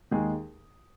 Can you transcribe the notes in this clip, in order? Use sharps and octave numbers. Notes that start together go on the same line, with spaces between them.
D#2 G#3 G#4